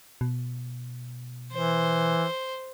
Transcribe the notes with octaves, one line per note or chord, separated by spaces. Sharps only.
B2
E3 C5